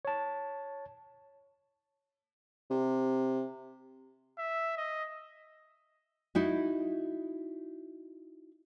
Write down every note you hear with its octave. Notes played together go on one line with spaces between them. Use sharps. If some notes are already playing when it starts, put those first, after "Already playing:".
C#5 A5
C3
E5
D#5
D#4 E4 F#4